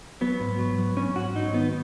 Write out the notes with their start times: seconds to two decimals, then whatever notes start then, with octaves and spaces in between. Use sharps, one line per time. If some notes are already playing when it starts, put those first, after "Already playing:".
0.21 F#3 B3
0.40 G#2
0.59 F#3
0.78 F#3
0.97 G#2 C#4
1.16 G#2 F#4
1.35 F#3 D#4
1.54 D#3 B3